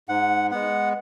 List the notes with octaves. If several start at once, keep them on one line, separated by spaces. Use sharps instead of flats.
G#2 F#5
G#3 B3 F#5